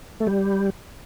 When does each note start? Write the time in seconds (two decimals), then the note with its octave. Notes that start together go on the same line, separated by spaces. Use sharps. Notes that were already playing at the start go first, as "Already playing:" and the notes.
0.20 A3
0.27 G3